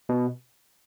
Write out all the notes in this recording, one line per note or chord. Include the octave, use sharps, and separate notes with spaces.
B2